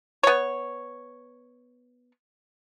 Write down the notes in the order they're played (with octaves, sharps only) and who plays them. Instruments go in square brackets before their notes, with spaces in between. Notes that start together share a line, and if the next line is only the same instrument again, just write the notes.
[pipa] B3 C#5